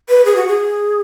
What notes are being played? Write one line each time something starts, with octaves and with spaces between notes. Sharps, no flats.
B4
G#4
F#4
G#4